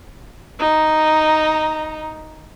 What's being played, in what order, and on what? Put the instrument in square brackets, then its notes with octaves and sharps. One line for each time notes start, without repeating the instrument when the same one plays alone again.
[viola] D#4 A#5